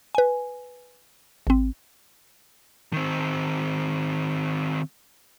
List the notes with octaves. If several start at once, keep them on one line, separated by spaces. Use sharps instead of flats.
B4 G#5
G#1 C4
D#3 C4